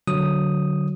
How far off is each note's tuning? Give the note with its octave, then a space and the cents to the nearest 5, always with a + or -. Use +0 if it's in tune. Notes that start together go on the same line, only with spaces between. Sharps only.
D3 +0 F#3 +0 D#6 +0